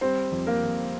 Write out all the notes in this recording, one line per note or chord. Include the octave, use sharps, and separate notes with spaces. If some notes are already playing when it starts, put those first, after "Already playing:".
G3 C4 C5
F2
A#3 A#4
F2